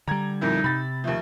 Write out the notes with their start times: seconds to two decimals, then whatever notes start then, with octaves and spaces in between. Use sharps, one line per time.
0.08 D3 G3 A#5 G#6
0.41 F2 A#2 D#4 E4
0.64 C3 B5 A6
1.04 D#2 F3 A3